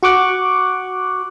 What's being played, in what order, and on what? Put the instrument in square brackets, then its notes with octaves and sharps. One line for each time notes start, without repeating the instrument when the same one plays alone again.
[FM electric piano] F#4 C#6 D6 F#6